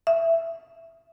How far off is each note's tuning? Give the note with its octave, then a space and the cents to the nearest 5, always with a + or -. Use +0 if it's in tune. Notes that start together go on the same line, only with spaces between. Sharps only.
E5 +10